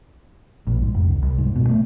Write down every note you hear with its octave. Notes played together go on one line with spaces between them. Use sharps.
A#1
G#2
F1
C2
C2
G#2
B2
A3